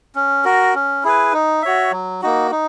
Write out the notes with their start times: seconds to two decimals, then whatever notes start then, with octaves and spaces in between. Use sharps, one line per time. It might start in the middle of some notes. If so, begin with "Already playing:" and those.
0.15 C#4
0.45 F#4 A#4
0.74 C#4
1.04 E4 G#4 B4
1.33 D#4
1.62 F#4 C#5 E5
1.92 F#3
2.22 A#3 D#4 F#4
2.51 D#4